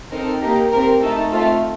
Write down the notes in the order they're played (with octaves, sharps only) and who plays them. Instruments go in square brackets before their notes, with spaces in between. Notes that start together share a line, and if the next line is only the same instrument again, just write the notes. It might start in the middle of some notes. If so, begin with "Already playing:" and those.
[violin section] C4 D#4 A4 A#4
A#3 D#4 G4 A#4
C4 G4 A#4
A3 D#4 A4
A3 C4 F4 A4